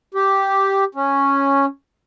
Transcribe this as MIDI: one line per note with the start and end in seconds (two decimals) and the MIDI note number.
0.14 0.84 67
0.95 1.66 61